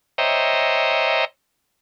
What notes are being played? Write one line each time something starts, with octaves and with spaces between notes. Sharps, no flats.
C5 C#5 D#5 E5 G5 A#5